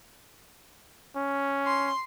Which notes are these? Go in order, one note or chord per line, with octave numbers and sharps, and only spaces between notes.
C#4
C6